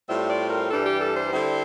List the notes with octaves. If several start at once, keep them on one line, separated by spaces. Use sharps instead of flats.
A2 G3 C4 F4 E5
D5
A#4
G2 E3 G3 D4 A4
G4
A4
C5
D3 G3 C4 E4